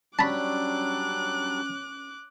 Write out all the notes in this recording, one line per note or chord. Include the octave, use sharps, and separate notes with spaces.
F#3 G3 C#4 D4 A5 B5 D6 F#6